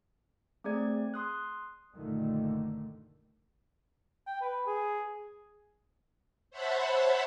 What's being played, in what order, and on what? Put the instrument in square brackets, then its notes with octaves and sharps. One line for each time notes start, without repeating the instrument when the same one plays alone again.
[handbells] A3 C4 G#4 D5 G#6
C6 D#6 F#6
[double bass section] F#1 A#2 D3 D#3 A3
[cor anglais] G5
B4
G#4
[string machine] C5 C#5 E5 F#5 A5 B5